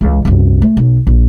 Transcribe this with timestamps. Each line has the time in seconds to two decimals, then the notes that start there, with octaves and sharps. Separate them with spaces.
0.01 C#2 E3
0.25 C2 F#2
0.62 A3
0.77 B1
1.07 A#1